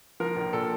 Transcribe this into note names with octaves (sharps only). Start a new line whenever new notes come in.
F3 A#4
A#1
A#2 A4